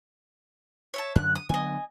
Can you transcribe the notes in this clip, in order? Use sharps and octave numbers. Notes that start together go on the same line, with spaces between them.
C#5 E5 A5
F#2 D3 F#3 F#6
D#6
D3 F#3 B3 D#5 G#5